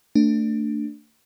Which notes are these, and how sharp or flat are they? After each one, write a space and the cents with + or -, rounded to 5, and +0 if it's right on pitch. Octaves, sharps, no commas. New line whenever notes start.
A3 +25 D4 +0